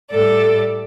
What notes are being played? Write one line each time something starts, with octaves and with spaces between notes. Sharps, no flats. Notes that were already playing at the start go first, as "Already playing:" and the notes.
A2 G3 A4 D5